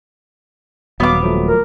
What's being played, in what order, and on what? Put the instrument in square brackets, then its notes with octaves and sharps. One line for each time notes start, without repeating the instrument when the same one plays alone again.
[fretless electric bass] D#1 [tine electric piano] F#3 F5 [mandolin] B3 D6
[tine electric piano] F3 F#3 A3
[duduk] A#4